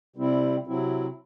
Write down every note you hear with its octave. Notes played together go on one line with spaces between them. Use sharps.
C3 G3 C4 E4
C3 F#3 C4 E4